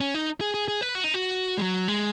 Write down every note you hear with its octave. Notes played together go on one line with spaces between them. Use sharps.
C#4
D#4
G#4
G#4
G#4
B4
F#4
D#4
F#4
G#3
F#3
G#3